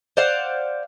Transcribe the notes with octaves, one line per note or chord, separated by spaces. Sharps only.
C5 D5 F5 F#5